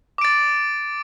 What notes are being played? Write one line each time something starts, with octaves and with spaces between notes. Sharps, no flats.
D6 A6 D7